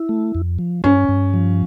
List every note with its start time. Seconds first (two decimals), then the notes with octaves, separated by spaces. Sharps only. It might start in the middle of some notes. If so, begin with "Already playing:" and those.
Already playing: E4
0.09 A3
0.35 F2
0.59 F3
0.84 G2 C#4
1.09 G2
1.34 F3